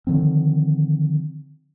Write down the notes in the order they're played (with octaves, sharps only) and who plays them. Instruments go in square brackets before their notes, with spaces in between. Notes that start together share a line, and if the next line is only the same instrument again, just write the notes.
[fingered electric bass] D3 D#3 F3 C4